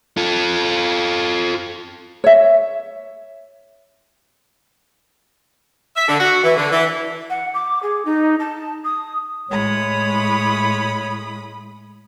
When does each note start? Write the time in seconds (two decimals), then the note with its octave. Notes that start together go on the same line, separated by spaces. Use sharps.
0.17 F4 A4
2.24 C#5 E5
5.95 E5
6.08 D3
6.20 F#4
6.43 E3
6.56 D3
6.71 E3
7.30 F#5
7.54 D6
7.83 G#4
8.05 D#4
8.40 A5
8.84 D#6
9.50 A2 G#3 E4 C#5 B5 D#6